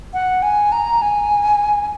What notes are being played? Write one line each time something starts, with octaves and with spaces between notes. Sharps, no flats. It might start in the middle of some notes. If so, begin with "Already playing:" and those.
F#5
G#5
A#5
G#5